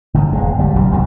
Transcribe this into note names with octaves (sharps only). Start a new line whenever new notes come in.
G1 G#2
E1 G#3
G1 G3
B1 F#2 C#3 G3
C2 F2 B2 D#3